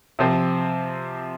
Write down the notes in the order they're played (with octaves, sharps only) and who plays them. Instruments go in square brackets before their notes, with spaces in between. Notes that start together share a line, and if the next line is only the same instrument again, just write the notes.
[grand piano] C3 F3 C4